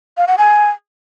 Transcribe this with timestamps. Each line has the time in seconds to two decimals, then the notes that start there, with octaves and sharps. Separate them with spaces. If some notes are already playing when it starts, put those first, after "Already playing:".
0.17 F5
0.28 F#5
0.38 G#5